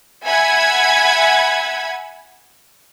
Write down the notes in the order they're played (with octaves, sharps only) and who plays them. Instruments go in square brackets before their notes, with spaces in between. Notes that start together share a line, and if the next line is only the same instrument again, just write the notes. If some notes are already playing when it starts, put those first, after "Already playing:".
[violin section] E5 F#5 G#5 B5 G#6